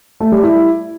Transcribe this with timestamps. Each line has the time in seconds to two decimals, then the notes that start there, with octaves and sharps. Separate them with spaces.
0.20 A3
0.32 G3
0.43 E4